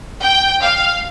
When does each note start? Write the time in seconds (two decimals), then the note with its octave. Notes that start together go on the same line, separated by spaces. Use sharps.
0.22 G5
0.61 F5